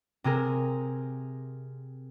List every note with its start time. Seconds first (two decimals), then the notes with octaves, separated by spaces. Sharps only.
0.24 C3 C4 G#4 A#4